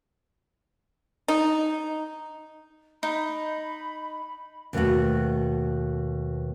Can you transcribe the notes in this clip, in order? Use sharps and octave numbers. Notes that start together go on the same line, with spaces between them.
D#4
D#4 B5
D#2 B2 A3 B3 F#4